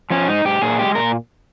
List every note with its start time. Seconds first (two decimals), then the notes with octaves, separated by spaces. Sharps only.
0.10 F3 C#4
0.28 G#2 D#4
0.45 G#2 G4
0.62 A#2 G#4
0.79 G#3 G4
0.95 A#2 A#4